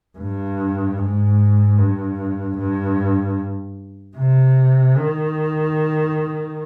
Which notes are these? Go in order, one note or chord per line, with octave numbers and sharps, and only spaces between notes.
G2
G#2
G2
G2
C3
D#3